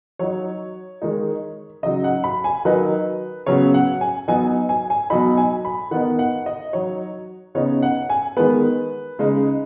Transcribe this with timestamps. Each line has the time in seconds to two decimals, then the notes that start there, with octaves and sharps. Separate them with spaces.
0.19 F#3 D#4 C#5
1.02 D#3 G#3 D#4
1.83 C#3 F#3 D#4 D#5
2.04 F#5
2.24 B5
2.44 G#5
2.65 D#3 F#3 D#4 B4
3.46 C#3 F#3 B3 C#5
3.74 F#5
4.01 G#5
4.28 F#3 B3 D#4 G#5
4.69 G#5
4.90 G#5
5.10 B2 F#3 D#4 B5
5.37 G#5
5.65 B5
5.91 D#3 B3 D#4 F#5
6.19 F#5
6.46 D#5
6.73 F#3 D#4 C#5
7.55 C#3 B3 D#4 C#5
7.82 F#5
8.10 G#5
8.37 D#3 G#3 B3 B4
9.19 C#3 G#3 D#4